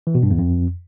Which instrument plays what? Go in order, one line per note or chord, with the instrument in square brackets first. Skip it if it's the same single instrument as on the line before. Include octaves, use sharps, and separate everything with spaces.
[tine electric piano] E3
B2
G2
E2
F2